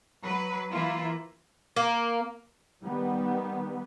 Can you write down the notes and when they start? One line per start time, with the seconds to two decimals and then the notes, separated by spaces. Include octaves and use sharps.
0.24 F#3 B4
0.71 E3 A#3 E4 F4
1.76 A#3
2.83 D#3 G3 B3